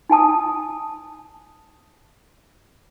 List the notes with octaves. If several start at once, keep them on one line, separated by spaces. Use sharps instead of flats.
D#4 G#5 A5 D#6